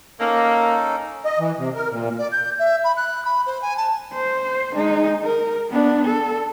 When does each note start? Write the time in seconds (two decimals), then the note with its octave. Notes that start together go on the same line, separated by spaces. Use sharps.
0.20 A#3 C#4 D#4 A4
1.25 D#5
1.40 E3
1.58 C3
1.75 A#4
1.90 A#2
2.18 D5
2.32 G6
2.59 E5
2.84 B5
2.97 F#6
3.25 B5
3.46 C5
3.62 G#5
3.77 A5
4.13 C5
4.74 G#3 D#4
5.23 A#4
5.69 B3 D4
6.06 A4